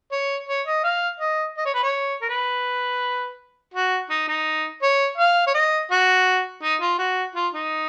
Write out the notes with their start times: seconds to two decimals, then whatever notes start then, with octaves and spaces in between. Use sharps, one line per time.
0.12 C#5
0.49 C#5
0.67 D#5
0.84 F5
1.20 D#5
1.57 D#5
1.65 C#5
1.74 B4
1.83 C#5
2.22 A#4
2.29 B4
3.74 F#4
4.10 D#4
4.28 D#4
4.82 C#5
5.18 F5
5.47 C#5
5.54 D#5
5.91 F#4
6.63 D#4
6.81 F4
6.98 F#4
7.35 F4
7.54 D#4